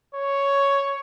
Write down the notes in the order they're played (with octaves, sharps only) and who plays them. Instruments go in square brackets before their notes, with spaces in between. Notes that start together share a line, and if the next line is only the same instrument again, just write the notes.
[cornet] C#5